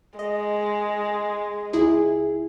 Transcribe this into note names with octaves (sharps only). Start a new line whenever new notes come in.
G#3 D#5
C#2 E4 G#4